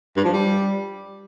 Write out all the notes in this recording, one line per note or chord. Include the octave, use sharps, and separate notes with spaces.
G2
F3
G3